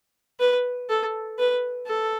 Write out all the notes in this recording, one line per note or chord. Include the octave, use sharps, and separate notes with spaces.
B4
A4
B4
A4